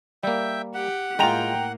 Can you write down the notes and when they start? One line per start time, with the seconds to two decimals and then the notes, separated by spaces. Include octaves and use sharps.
0.23 G3 A#3 E5 G5
0.74 G4 F#5
1.19 A2 G#3 A#3 F4 G5 A#5 F7